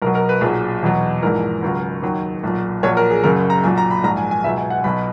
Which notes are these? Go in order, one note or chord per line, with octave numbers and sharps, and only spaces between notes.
B1 B2 F#3 A#4
A#4
B4
B1 A#2 F#3 G#4
E2 B2 F#3
A#1 G#2 E3 A#4
C#2 C#3 F#3
D#2 D#3 F#3
B1 A#2 F#3
A#1 A#2 F#3 C#5
A#4
G#4
F#1 F#2 C#3 A#4
A#5
B1 A#2 F#3 G#5
A#5
B5
A#1 G#2 F#3 A#5
G#5
G#5
C#2 B2 F#3 E5
G#5
F#5
B1 B2 F#3 B5